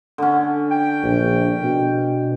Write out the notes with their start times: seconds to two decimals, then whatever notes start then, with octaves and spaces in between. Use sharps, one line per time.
0.18 D3 C#4
0.71 G5
1.03 A#1
1.64 B2